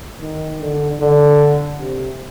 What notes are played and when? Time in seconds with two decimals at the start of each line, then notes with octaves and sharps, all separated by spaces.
0.21 D#3
0.61 D3
1.00 D3
1.79 C3